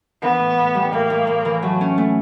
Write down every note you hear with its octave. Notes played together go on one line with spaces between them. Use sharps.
E3 B3
A2
A2
G3
A2 A#3
A2
A2
E3
F#3 A3
C#4
A3